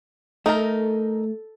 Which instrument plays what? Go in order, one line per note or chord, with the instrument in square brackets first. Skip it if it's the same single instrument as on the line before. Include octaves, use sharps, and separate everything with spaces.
[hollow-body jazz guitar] A3 [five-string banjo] D#4 A#4 [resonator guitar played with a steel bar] A4